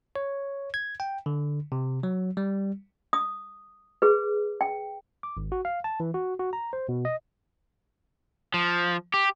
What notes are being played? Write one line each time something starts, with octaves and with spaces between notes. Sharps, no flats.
C#5
G#6
G5
D3
C3
F#3
G3
D#6
G#4 B4
G5
D6
G#1
F#4
F5
A5
E3
F#4
F#4
A#5
C5
B2
D#5
F3
G4